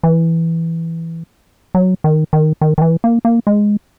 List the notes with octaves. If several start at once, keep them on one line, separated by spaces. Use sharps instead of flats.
E3
F#3
D#3
D#3
D#3
D#3
E3
A#3
A#3
G#3